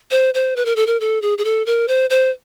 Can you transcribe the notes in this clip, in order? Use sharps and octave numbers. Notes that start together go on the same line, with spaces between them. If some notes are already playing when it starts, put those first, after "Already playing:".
C5
C5
B4
A#4
A4
A#4
A4
G#4
G#4
A4
A#4
C5
C5